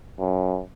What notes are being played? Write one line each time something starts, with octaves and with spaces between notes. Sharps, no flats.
F#2